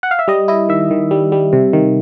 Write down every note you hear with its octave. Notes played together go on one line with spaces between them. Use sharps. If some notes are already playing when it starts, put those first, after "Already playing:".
F#5
F5
E5
G3 D#5
E4 D#5
D#3 E5
D#3
G3
G3
C3
D#3